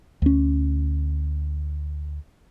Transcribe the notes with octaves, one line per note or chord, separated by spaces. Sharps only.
D2 C#4